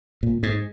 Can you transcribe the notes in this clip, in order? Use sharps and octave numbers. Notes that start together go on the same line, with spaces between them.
A#2
G#2